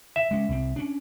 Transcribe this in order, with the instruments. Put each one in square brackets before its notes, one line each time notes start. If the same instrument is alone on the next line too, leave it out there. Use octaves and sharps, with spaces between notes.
[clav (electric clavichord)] E5
[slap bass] G#3 C#4
C2 C4
C#4 D4